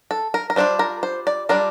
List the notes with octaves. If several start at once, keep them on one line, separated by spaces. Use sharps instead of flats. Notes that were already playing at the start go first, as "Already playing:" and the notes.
A4
A#4
A#4
G3 D4 F4 C5
A#4
C5
D5
G3 D4 F4 A#4